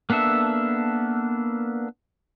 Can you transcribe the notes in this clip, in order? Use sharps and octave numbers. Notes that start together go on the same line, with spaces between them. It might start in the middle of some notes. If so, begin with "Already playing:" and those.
A#3 B3 D4 A4 E5